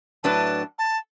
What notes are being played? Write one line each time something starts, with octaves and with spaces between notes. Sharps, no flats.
A2 F#3 D4 B4 A5
A5